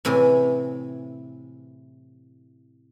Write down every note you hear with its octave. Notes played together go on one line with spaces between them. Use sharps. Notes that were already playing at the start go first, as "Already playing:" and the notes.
A2 C3 E3 G#4 G#5